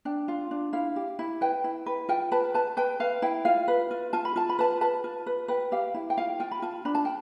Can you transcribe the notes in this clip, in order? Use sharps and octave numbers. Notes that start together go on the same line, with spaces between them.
D4 G5
F4
D4
E4 F5
G4
E4
B4 G5
E4
B4
F4 G5
B4 A5
B4 A5
B4 G5
B4 F5
E4 G5
F4 F5
B4
F4
F4 A5
B5
F4 A5
B5
B4 A5
B4 A5
F4
B4
B4 G5
G4 F5
E4
G5
F4 F5
F4 G5
B5
F4 A5
D4 B5
A5
G5